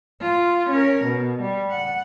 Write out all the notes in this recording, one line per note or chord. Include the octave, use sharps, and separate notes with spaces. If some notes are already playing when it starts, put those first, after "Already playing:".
F4
C#4 A#4
B2
G3
F#5